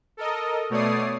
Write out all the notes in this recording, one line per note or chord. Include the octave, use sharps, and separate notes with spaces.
A4 A#4 D#5
B2 A3 C#5 D5 D#6 C7